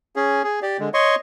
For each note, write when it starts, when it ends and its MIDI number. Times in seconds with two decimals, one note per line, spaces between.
0.16 0.43 61
0.16 0.43 68
0.44 0.60 68
0.62 0.77 67
0.62 0.77 74
0.80 0.89 50
0.80 0.89 56
0.94 1.15 73
0.94 1.15 75
0.94 1.15 84
0.94 1.15 85